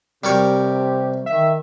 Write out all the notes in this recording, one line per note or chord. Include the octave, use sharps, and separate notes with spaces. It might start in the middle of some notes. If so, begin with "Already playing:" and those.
C3 G3 G4 A#4 C#5
D#3 E5